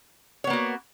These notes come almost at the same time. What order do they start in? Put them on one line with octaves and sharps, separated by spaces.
C#5 B3 A#3 F#4